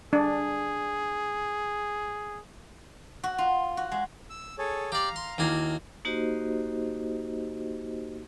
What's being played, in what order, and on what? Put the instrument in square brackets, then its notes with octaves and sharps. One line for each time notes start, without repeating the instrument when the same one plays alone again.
[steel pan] D4 [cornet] G#4
[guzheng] F#4
F4
F#4
G#3
[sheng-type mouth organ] E6
G#4 A4 C#5
[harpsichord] G4 D5 [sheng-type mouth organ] F5 A#5
[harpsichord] C6
[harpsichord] D#2 A#3 G#5 [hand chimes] D#4 E4 F#4
[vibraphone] A#3 D#4 F#4 G4 C5 D#5